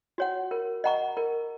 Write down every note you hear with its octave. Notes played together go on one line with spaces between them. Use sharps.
F#4 C#5 F#5
A#4
D#5 F#5 A#5 C#6
A#4